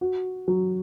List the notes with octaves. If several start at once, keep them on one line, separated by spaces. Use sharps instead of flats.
F#4
F#3